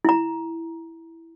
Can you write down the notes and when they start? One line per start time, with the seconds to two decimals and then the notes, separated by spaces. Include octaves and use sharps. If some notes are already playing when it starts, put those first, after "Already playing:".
0.05 E4 A#5